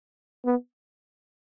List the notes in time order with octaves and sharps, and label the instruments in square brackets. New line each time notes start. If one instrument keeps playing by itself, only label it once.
[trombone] B3